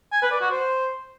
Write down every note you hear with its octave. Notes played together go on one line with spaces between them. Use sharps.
G#5
B4
D5
F#4
C5